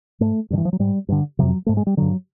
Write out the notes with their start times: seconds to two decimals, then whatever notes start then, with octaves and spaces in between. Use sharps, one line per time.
0.20 G#2 A3
0.50 G2 D3
0.58 E3
0.65 F3
0.73 F#3
0.79 G#2 G3
1.09 G2 D3
1.39 F2 C3 F#3
1.66 G#2 A3
1.77 G#3
1.87 G3
1.97 G2 D3 F#3